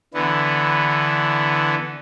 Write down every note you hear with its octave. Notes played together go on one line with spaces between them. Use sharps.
D3 E3 B3